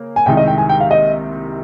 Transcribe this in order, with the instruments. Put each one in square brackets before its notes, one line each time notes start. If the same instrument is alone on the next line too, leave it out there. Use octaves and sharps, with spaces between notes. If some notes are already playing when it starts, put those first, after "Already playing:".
Already playing: [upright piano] C#3 A#3
[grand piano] G#5
[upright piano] C2 C3 D#3 G#3 D#4 [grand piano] G5
[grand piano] D#5
G5
G#5
G5
F5
D#5